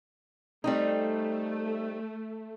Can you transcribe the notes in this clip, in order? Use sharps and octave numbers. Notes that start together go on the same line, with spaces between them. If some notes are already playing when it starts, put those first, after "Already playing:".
G3 A3 C4 D#4